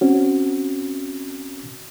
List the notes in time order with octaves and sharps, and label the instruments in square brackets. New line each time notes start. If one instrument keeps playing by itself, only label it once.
[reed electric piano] C4 C#4 F#4